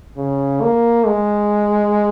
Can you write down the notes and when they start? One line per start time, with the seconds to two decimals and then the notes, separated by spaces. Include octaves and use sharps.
0.17 C#3
0.61 A#3
1.06 G#3